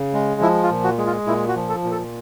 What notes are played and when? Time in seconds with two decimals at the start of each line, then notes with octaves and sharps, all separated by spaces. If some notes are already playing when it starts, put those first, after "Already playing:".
Already playing: C#3
0.13 G#3
0.41 F3 E4
0.64 F4
0.70 A#2
0.84 F#4
0.98 G#3
1.06 F4
1.27 A#2 E4
1.48 F#4
1.56 F3
1.69 A4
1.84 A#2
1.91 A4